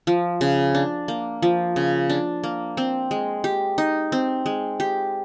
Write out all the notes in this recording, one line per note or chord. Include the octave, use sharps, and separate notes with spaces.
F3
C#3
D4
A#3
F3
C#3
D4
A#3
C4
G#3
G4
D#4
C4
G#3
G4